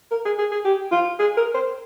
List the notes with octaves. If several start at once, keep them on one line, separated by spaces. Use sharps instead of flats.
A#4
G#4
G#4
G#4
G4
F4
G#4
A#4
C5